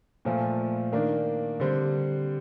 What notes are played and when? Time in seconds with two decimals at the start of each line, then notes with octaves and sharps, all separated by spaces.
0.25 A#2 F3 A3
0.92 D#3 A#3 D4
1.60 D3 G3 C4